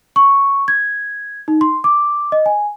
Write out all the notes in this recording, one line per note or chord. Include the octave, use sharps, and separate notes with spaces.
C#6
G#6
D#4
C6
D6
D#5
G#5